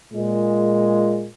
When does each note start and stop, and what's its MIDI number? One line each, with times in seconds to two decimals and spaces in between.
0.13 1.26 46
0.13 1.26 56